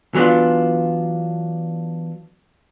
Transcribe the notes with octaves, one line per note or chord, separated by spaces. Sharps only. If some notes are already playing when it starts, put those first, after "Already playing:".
E3 F#3 B3 D4 F4